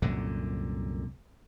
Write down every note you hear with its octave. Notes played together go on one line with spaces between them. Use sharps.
C2 F#2 A#2 D3